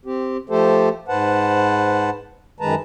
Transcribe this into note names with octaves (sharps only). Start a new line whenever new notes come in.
C4 G4
F3 A3 G4 A4 C5
G#2 B4 C5 F#5 A5
F#2 D#3 G#3 B4 A5 A#5